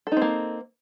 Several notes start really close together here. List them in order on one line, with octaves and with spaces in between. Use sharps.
A4 D#4 C4 A#3